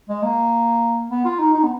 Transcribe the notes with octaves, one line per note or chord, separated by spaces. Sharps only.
G#3
A#3
B3
F4
D#4
D#4
B3